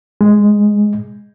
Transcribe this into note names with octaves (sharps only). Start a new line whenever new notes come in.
G#3